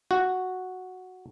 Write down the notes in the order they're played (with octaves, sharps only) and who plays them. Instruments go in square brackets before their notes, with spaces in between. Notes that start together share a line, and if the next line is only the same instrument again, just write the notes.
[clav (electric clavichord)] F#4